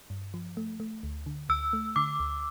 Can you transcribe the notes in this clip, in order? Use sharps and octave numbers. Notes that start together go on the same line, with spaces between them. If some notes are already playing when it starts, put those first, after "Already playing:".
G2
F3
A3
A3
D2
D3
D2 E6
A3
D3 D6
D2